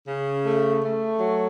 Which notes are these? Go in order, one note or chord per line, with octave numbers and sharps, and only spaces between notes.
C#3
A3
A3
F#3